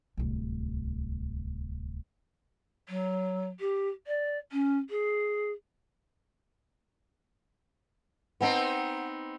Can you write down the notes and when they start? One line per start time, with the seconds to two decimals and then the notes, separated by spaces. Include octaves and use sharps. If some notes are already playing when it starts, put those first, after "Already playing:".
0.17 D1 C2
2.89 F#3
3.60 G4
4.07 D5
4.52 C#4
4.90 G#4
8.41 B3 C4 D#4 B4 F#5 A5